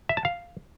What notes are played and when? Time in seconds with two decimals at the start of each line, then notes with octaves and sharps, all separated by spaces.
0.09 E5
0.17 A5
0.25 F5